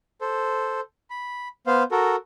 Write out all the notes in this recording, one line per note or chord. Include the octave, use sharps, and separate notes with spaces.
A4 C5
B5
B3 C5 F5
F#4 A4 A#4